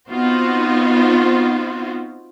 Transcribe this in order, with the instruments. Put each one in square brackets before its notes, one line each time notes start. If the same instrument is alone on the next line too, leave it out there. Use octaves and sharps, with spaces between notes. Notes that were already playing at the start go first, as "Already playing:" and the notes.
[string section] B3 C4 D#4 F4 F#4 C5